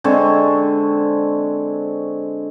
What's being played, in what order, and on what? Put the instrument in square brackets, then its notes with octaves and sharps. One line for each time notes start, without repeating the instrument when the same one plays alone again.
[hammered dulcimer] D3 G#3 C4 C#5